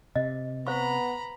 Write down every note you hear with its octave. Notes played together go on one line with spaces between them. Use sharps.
C3 D#5
B3 C5 F5 A#5 B5 C#6